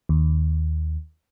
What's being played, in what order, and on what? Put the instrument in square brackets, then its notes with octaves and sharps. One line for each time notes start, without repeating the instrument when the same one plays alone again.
[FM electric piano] D#2